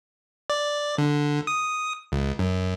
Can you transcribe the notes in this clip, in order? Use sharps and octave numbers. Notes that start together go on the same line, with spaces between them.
D5
D3
D#6
C#2
F#2